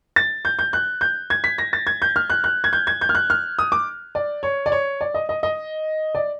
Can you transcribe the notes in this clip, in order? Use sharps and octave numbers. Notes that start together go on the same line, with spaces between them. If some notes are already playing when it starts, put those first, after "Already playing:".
A6
G6
G6
F#6
G6
G#6
B6
A#6
A6
G#6
G6
F6
F#6
F#6
G#6
G6
G#6
G6
F6
F#6
F6
D#6
D6
D5
C#5
D5
C#5
D5
D#5
D#5
D#5
D5